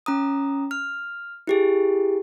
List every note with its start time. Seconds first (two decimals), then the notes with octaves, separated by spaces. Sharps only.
0.06 C#4 A#5 D#6
0.71 F6
1.47 E4 G4 G#4